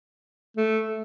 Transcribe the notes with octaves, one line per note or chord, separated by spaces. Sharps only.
A3